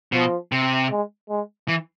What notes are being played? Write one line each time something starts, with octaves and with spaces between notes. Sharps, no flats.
B2 F3
C3
G#3
G#3
E3